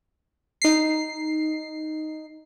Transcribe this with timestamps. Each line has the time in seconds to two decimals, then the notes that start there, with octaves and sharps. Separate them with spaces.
0.62 D#4 C7